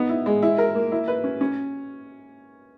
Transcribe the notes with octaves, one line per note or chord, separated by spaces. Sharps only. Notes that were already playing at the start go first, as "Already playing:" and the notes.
Already playing: B3 D#4
E4
G#3
E4
A#4
A#3
E4
B4
C#4
C#4